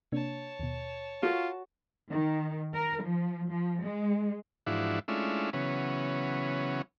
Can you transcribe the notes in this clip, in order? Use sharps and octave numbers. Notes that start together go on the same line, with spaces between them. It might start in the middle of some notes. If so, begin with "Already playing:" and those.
C3 A#3 D4 C#5 A5
D#2 B2
F4 F#4 A4 A#4 C#6
D#3
A#4
F3
F3
G#3
G#2 E3 F3 D4 E4 F#4
G#3 A3 C#4 D4 E4 F4
C#3 E3 F#3 B3 C#4